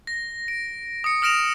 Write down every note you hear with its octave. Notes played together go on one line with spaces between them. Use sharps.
A#6
D7
D#6 C#7
D#6 F6 A#6 D7 E7 F7